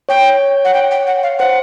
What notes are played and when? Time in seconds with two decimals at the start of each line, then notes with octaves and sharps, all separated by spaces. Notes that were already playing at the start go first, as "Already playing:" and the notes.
0.09 C#5 G5
0.65 F#5
0.74 G5
0.91 G5
1.07 F#5
1.23 F5
1.39 C5 F#5